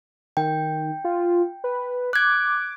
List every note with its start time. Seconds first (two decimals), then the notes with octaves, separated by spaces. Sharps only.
0.37 D#3 G5
1.04 F4
1.64 B4
2.13 D6 F#6 G#6